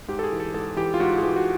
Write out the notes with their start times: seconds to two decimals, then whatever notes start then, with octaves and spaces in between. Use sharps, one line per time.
0.08 G#2 G4
0.19 A4
0.23 G#4
0.32 E3
0.40 A4
0.54 G#2 A4
0.77 E3 G4
0.94 F4
1.00 G#2 F#4
1.18 G#4
1.22 E3 G4
1.36 F#4